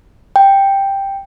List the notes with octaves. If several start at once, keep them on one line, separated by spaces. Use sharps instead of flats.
G5